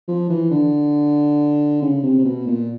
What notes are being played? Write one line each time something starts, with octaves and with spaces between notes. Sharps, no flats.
F3
E3
D3
C#3
C3
C3
B2
A#2